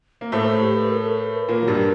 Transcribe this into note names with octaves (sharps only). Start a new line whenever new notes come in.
A#3
A2 A3 C5
C5
G4
B4
A#4
A4
A#4
B4
A#2 A#3 A#4
F#3
G2 G3